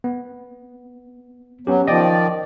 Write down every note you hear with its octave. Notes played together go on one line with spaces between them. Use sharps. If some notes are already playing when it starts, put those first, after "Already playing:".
B3
F#3 B3 C#4 G4
D#3 F3 D5 D#5 G5